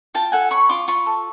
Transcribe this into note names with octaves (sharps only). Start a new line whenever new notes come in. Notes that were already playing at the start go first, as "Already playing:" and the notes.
F4 G5 A5
A4 F#5 G#5
C#5 B5 C#6
F4 C6 D6
F4 B5 C#6
A4